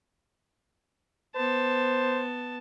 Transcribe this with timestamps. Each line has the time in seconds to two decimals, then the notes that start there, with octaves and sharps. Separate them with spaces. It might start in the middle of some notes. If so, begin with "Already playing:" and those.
1.36 B3 C5 A5